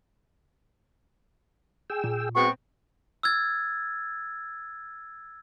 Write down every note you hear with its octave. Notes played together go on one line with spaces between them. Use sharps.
G#4 G5 E6
A#2
G#3 B3 C4 F#4 C#6
E6 F6 G#6 A6